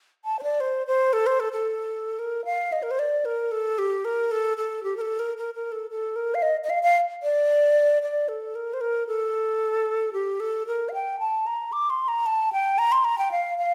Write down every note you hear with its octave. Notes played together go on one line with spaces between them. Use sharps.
A5
C5
D5
C5
C5
A4
C5
A4
A4
A#4
F5
D#5
A#4
C5
D5
A#4
A4
G4
A#4
A4
A4
G4
A#4
A4
A#4
A#4
A#4
A4
A4
A#4
F5
D#5
D#5
F5
F5
D5
D5
A4
A#4
C5
A#4
A4
G4
A4
A#4
F5
G5
A5
A#5
D6
C6
A#5
A5
G5
A#5
C6
A#5
G5
F5
F5